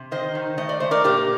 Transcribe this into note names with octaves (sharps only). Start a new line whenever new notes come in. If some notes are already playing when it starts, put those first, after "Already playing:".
Already playing: C3
D#3 C5 D#5
D#3
A3 D#5
D5
A3 C5
A#4 D5
A#2 G4 A#4